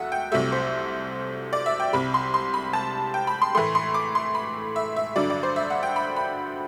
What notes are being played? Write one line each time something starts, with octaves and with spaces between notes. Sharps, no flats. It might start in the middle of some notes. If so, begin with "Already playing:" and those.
Already playing: E2 F#3 A3 E5 F#5
G5
C2 C3 F#3 A3 E5
C5
D5
E5
G5
C2 C3 G3 B5
C6
C6
B5
A5
G5
B5
C6
A2 E3 A3 C6
C6
D6
C6
B5
E5
E5
G2 D3 F#3 D5
D5
C5
E5
F#5
G5
B5
B5